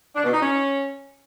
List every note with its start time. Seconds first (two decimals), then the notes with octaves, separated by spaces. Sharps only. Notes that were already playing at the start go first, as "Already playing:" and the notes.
0.15 D4
0.24 B2
0.32 D#4
0.41 C#4